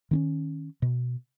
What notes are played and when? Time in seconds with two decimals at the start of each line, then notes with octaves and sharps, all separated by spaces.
0.11 D#3 C4 C#4
0.82 B2